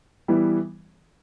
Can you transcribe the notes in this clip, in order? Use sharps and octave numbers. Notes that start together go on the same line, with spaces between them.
E3 G3 B3 E4